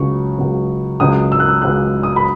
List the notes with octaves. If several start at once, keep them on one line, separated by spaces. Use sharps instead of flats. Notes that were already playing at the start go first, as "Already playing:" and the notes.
Already playing: C#2 C#3 F#3 C#6
C#2 C#3 F#3
C#2 C#3 F#3 D#6
E6
F#6
E6
C#2 C#3 F#3 F#6
D#6
B5